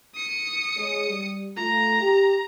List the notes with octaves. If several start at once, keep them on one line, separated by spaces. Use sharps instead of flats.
D#6 C#7
G#3 G#4 C#5
G3
A3 F4 A#5
G4